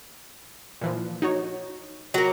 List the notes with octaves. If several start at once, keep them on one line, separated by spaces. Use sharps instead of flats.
A#2 E3 F3
D#4 F#4 C#5
F#3 A#3